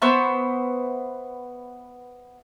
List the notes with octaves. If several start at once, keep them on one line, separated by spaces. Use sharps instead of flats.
B3 C5 E5 C#6